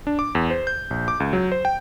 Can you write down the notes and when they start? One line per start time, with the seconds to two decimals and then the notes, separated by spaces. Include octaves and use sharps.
0.07 D4
0.19 D6
0.35 E2
0.50 C5
0.67 G6
0.91 A#1
1.08 D6
1.20 C#2
1.33 F#3
1.52 C5
1.65 G5